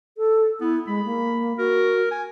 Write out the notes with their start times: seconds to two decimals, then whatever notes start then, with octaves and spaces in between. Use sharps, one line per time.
0.17 A4
0.61 B3 E4
0.87 G#3 B5
1.05 A#3
1.58 F#4 A#4
2.11 G#5